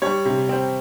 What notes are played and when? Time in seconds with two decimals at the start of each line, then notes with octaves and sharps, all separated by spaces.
0.02 G3 C#5
0.25 C3
0.49 C4